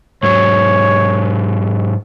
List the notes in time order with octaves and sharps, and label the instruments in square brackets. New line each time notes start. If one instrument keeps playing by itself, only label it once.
[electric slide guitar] G#2 F#3 [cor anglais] C#5